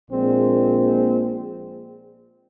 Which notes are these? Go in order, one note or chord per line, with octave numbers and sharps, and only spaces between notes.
A#1 A#2 G#3 C4